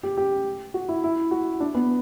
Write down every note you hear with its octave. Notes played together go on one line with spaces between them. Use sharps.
G4
G4
F#4
E4
E4
F#4
D4
B3